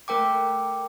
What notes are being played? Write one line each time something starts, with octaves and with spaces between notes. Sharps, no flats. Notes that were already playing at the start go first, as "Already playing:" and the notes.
A3 A#4 G5 D6